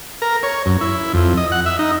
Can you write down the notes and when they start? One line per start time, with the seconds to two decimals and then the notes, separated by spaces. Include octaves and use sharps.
0.22 A#4
0.43 C#5
0.66 F#2
0.81 E4
1.14 F2
1.37 D#5
1.52 F#5
1.66 E5
1.79 D#4